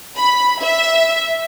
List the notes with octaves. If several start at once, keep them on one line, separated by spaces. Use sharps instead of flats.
B5
E5